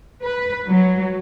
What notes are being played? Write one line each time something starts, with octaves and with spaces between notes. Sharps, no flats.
B4
F#3